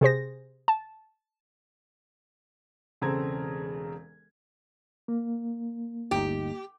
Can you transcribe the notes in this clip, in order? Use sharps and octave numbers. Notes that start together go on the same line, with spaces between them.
C3 G#4 C5 A#6
A5
E1 C#3 C4 A4 A#5 G#6
A#3
G1 D2 D#4 G4